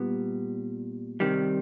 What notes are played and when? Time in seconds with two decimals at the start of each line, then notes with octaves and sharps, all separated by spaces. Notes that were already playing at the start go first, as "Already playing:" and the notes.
Already playing: A#2 G3 B3
1.20 C3 D#3 G3